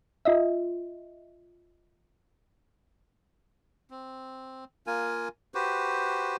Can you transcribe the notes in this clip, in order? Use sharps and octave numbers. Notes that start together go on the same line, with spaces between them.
F4 D#5 E5
C4
A#3 F4 A#4 G#5
F#4 G4 B4 C5